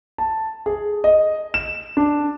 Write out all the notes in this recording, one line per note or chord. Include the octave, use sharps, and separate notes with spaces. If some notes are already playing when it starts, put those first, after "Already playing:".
A5
G#4
D#5
E7
D4